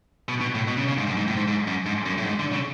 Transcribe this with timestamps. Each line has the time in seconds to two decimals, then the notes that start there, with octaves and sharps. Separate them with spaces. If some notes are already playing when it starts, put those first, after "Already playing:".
0.29 B2
0.41 B2
0.55 A2
0.68 B2
0.78 C#3
0.88 C#3
0.98 G#2
1.07 F#2
1.17 G#2
1.28 A2
1.36 G#2
1.48 G#2
1.67 F#2
1.86 G#2
2.06 F#2
2.18 A2
2.26 G#2
2.39 D3
2.53 C#3